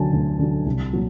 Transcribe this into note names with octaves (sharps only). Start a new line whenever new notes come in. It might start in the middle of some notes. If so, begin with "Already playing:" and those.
Already playing: D2 D3 F#3 G#5 A5
D2
D3 F#3
C2
A#2 F#3 A#3